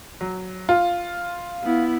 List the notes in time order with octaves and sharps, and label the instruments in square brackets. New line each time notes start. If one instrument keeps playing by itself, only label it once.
[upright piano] F#3
F4
[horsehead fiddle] B3 E4